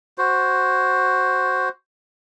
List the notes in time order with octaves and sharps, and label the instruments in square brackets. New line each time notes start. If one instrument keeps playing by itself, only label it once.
[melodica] F#4 C5